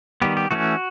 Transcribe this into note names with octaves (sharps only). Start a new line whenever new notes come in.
D#3 G3 B3 G4
G4
E3 A3 C#4 F#4